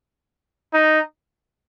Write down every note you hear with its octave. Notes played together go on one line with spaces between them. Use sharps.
D#4